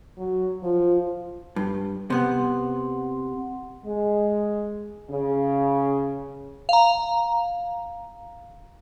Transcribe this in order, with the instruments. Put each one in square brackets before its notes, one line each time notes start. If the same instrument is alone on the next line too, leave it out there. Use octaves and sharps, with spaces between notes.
[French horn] F#3
[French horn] F3 [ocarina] F4
[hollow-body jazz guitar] G2
[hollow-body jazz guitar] C3 B3 [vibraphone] F#5 C6
[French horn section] G#3
C#3
[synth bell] F5 A#5